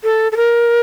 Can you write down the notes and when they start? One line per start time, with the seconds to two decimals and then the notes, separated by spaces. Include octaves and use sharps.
0.04 A4
0.32 A4
0.37 A#4